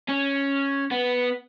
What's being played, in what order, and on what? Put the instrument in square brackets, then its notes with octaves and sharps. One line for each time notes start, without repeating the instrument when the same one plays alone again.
[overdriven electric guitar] C#4
B3